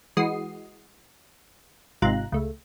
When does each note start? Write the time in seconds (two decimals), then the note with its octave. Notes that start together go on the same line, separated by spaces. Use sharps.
0.17 E3 G#3 F#4 D#5 D#6 C7
2.02 G#1 G#2 C3 F4 A#5 F#6
2.32 C#2 A3